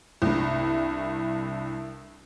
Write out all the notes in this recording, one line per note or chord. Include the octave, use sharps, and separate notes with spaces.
C2 G2